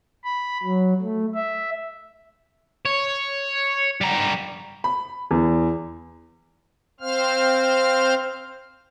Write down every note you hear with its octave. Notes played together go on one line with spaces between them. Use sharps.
B5
F#3
A3
E5
C#5
G3 A#5
B5
E2
C4 C5 F5 F6